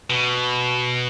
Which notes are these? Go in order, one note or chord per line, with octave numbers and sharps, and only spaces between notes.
B2